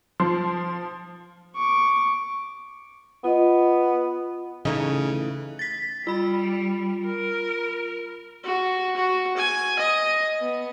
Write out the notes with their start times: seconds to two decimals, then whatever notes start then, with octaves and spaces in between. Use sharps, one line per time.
0.20 F3 C6
1.56 C#6 D6
3.24 B3 F4 D#5
4.65 C#3 E3 A3 D#4
5.59 A6 B6
6.07 G3 F4 B5
7.05 A#4
8.44 F#4
8.96 F#4
9.37 G#5
9.79 D#5
10.40 B3